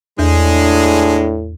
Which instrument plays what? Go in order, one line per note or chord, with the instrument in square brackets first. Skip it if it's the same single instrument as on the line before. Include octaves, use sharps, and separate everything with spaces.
[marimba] E2 [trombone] A2 [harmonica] G#3 G#4 [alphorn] D4